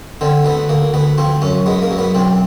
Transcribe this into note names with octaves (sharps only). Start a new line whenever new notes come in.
D3 C4
D2 B3
D2 A#3
D2 B3
F3 C4
F#2 C#4
G#3 B3
A#3
F#2
B3
B1 C4